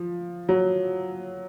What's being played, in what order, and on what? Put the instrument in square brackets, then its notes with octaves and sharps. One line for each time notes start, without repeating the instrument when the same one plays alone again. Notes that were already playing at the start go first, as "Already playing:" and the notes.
Already playing: [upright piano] F3
F#3